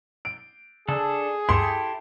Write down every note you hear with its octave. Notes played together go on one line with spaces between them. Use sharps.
D7
C#3 D4 G#4 A4
D2 G2 E4 G4 A4 C6